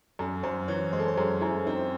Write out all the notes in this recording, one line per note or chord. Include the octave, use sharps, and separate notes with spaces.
F#2 A4
F#2 C5
E3 C#5
G#3 C5
A4
C5
F#2 G#4
F#2 E4
C4 D#4